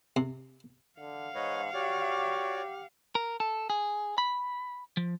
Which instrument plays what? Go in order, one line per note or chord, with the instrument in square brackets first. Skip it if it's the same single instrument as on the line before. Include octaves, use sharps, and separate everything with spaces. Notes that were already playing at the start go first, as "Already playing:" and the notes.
[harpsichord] C3
[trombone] D3 [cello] F5 F#5
[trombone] G#2 [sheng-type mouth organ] B4 C#5 D#5
[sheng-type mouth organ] F#4 C#5 D5 [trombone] G4
[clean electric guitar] A#4
A4
G#4
B5
F3